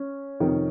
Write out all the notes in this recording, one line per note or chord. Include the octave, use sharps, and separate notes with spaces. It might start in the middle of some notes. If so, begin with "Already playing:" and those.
Already playing: C#4
F2 C3 D#3